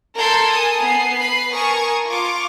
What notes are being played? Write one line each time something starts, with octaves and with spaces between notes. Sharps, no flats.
A4 A#4 A5 C6 G6 G#6
G#5 A5 D#6
B3 G#5 C7
B4 B5 C7
A#4 G#5 A5 C#6 D#6 G#6
F4 C#6 D6